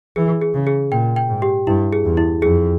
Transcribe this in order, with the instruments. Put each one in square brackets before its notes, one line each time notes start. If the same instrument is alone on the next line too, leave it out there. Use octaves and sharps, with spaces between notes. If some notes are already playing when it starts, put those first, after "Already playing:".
[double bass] E3 [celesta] G#4
[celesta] G#4
[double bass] C#3
[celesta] G#4
[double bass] A#2 [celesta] G5
[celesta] G5
[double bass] G#2
[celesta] G4
[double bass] G2 [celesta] E4
[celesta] G#4
[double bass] E2
[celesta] E4
[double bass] F2 [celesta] G#4